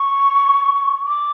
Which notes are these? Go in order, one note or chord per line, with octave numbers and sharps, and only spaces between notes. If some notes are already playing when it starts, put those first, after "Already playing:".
Already playing: C#6
D6